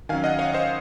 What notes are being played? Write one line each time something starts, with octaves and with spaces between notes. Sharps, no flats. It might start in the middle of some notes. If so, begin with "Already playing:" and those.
D#3 F#3 C#4 F5 G#5
D#5 F#5
C#5 F5
C5 D#5